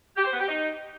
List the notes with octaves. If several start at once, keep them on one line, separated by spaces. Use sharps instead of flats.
G4
C5
B3
G4
D#4